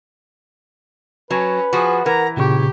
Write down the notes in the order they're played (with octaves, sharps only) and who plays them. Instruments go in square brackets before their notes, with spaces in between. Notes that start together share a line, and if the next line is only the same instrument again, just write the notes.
[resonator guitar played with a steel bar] F#3 [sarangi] C#4 [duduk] B4
[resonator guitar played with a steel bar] F3 F#4 [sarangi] G#4
[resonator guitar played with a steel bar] E3 [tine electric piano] A#4 F#5 [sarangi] A#5
[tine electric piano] A#2 C#3 C#6 [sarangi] G4